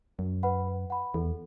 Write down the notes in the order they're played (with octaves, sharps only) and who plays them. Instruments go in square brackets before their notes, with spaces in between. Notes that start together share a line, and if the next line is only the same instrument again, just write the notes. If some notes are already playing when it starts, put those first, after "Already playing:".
[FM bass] F#2 [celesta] F#4
[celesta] B4 F#5 B5
B4
F#5 B5
[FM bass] E2 [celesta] A4